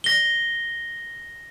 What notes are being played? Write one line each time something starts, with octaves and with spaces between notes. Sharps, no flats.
A#6 G7